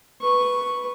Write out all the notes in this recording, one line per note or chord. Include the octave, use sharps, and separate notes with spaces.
B4 C#6